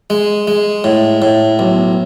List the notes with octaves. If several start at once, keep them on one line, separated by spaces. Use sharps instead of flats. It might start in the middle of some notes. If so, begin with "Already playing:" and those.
G#3
G#3
A2
A2
B1